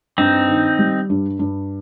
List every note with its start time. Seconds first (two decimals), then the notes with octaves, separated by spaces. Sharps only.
0.18 G2 C4 D#4
0.48 D#3
0.79 G3
1.10 G2
1.39 G2